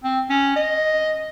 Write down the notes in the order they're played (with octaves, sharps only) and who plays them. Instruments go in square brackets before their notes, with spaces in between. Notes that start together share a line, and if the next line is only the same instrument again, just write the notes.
[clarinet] C4
C#4
D#5